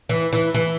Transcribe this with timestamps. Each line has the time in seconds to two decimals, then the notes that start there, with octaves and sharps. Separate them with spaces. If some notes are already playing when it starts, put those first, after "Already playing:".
0.09 E3
0.33 E3
0.54 E3